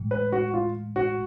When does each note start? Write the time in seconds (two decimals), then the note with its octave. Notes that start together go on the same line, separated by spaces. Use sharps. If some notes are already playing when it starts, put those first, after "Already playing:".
Already playing: A2 E3 G#3
0.11 B4
0.32 F#4
0.54 F4
0.96 F#4